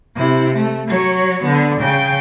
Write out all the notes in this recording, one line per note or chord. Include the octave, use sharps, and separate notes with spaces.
C3 E4
A3
F#3 C#5
D3 B3
C#3 G5